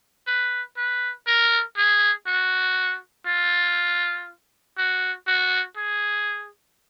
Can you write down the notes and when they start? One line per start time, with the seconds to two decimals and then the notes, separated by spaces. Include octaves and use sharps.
0.27 B4
0.77 B4
1.27 A#4
1.77 G#4
2.27 F#4
3.26 F4
4.77 F#4
5.27 F#4
5.77 G#4